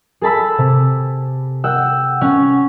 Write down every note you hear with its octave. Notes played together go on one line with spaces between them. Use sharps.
G#4 A4 A5 B5 E6
C3
F#5 G5 E6
C#4 C#5 F#5